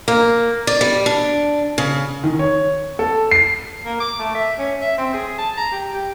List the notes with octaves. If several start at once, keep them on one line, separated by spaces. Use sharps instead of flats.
A#3
D5
G3
D4
C#3
D#3
C#5
A4
C7
A#3
D6
A3
E5
C#4
E5
C4
G#4
A5
A#5
G4
G4